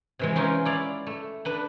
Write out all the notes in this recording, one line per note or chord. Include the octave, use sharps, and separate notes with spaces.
C3 E3 G#3
E3 C#4 D#4 F4
E4 D5 F5
A3
D4 B4 B5